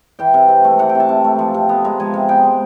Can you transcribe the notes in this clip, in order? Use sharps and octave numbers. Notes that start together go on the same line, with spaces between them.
E3 G5
C3
C3
A3
E3 F#5
G5
C3
A5
C3
A3
F3
C3
B3
G#3 A#5
F3 G#5
C3
B3 G5
G#3